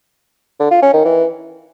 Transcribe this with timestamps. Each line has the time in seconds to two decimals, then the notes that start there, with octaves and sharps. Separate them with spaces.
0.60 D3
0.71 F4
0.82 C#4
0.93 D#3
1.05 E3